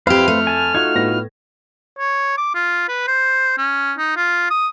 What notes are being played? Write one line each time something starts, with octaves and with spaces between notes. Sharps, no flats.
F2 E4 G4 B4 C5 F5 F6
A3
G#5 A5
D#4 F4 F#4 G#6
A2 B3 A#6
C#5
D6
F4
B4
C5
C#4
D#4
F4
D#6